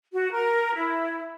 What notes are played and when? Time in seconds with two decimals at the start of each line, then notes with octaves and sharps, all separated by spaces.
0.13 F#4
0.31 A#4
0.74 E4